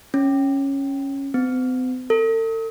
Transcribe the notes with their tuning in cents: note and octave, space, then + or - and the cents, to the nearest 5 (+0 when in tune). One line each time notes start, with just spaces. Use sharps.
C#4 -10
C4 -45
A4 +40